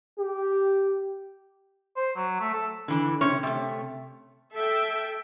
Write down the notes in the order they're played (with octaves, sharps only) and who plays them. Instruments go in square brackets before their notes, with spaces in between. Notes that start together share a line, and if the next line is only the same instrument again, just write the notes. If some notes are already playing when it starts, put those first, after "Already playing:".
[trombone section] G4
[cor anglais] C5
F#3
A3
A4
[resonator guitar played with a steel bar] D3 E3 D4
C3 C#4 C#5
C3 A3
[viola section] A4 E5 G5